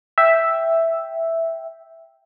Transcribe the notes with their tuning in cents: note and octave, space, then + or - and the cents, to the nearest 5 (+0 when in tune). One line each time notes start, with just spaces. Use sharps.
E5 +0 G5 +0